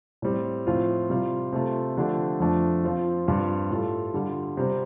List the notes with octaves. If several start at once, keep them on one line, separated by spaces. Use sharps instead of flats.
A2 G3 C4
A2 F3 C4 F4
C3 G3 F4
C3 A3 F4 A4
D3 F3 A3 D4 G4
F2 F3 A3 D4
F3 C4 F4
G2 G3 C4 F4
A2 G3 F4 A4
D3 G3 F4
C3 G3 C4